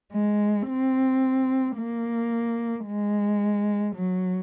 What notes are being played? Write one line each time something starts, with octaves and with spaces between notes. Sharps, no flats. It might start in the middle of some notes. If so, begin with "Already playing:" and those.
G#3
C4
A#3
G#3
F#3